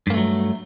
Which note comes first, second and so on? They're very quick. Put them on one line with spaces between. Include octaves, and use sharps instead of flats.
G2 A#3 A3 F#3